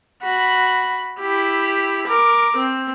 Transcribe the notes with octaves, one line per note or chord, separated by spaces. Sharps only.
F#4 B5
E4 G4
A#4 D6
C4